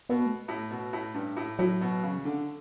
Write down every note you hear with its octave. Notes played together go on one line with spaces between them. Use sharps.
B2 B3
A3
A2
B2
A2
G2
A2
A2 F#3
B2
C#3
D3